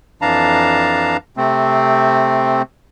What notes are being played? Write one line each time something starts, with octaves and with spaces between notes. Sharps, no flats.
F2 E3 D4 F5 A5 A#5
C3 A3 C4